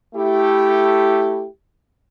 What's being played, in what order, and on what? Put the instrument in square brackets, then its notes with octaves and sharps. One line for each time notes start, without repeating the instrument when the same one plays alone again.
[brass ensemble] A3 E4 G4